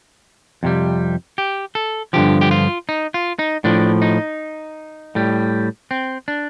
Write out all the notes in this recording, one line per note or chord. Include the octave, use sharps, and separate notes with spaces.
F2 C3 G3
G4
A4
G2 D3 F3 G4
G4
F4
D#4
F4
D#4
A2 F3 D4
D#4
A2 G3
C4
D4